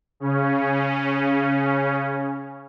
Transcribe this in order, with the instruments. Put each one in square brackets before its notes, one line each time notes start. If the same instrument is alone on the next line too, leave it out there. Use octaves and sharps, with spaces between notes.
[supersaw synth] C#3 C#4